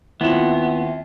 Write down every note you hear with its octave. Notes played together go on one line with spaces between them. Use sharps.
D#2 B3 C4 E4 F4 E5 E7